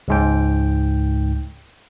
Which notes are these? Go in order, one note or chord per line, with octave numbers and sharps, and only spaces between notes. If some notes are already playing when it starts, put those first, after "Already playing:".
C#2 G#2 G5